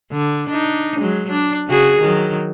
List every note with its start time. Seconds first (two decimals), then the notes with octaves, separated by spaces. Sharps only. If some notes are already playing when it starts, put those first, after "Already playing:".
0.12 D3
0.50 D4 D#4
1.00 F#3 G#3
1.30 D4
1.68 C#3 F#4 G#4
1.99 D#3 F#3